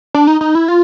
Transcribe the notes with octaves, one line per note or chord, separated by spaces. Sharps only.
D4
D#4
D#4
E4
F4